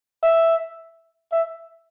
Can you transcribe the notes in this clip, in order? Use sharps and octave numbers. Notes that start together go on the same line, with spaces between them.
E5
E5